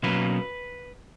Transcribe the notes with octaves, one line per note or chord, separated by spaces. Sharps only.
B2 F#3 A#3 C#4 B4